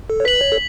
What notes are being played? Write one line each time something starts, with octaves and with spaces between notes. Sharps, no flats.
A4
C#5
B4 B6 F#7
C#5
A4